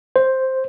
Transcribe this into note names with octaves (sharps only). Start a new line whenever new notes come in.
C5